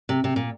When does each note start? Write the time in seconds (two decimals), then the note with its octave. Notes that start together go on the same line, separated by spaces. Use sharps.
0.09 C3
0.24 C3
0.36 A#2